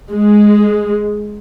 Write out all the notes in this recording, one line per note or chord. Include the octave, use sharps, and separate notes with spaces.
G#3